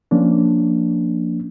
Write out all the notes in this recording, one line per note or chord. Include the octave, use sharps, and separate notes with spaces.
F3 A#3 C#4 D4